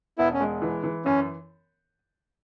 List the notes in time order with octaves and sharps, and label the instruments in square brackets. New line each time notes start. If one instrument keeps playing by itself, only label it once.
[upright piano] E1 [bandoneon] B3 E4
[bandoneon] C#4
[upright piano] G#3
E3
E3
[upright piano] F#2 [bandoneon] C#4